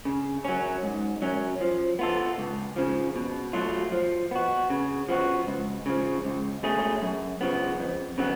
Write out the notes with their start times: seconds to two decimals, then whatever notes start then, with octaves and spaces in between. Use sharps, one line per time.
0.05 C#3
0.45 F#3 C#4
0.83 G#2
1.22 F#3 C#4
1.61 F3
1.99 B3 F4 A4
2.38 C#2
2.76 C#3 F3
3.16 B2
3.53 F#3 A3 F4
3.92 F3
4.31 B3 F#4
4.70 C#3
5.08 F3 B3 F#4
5.47 C#2
5.86 C#3 F3
6.25 C#2
6.63 B2 A3 C#4 G#4
7.02 F#2
7.41 C#3 F3 B3
7.79 F2
8.18 C#3 F#3 B3